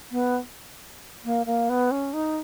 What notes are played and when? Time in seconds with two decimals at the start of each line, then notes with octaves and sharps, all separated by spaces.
0.12 B3
1.25 A#3
1.46 A#3
1.69 B3
1.91 C#4
2.13 D#4